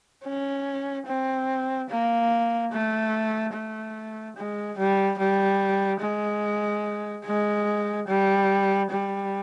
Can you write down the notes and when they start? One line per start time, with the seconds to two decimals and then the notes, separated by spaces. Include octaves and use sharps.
0.24 C#4
1.07 C4
1.90 A#3
2.72 A3
3.54 A3
4.37 G#3
4.78 G3
5.18 G3
6.01 G#3
7.25 G#3
8.07 G3
8.90 G3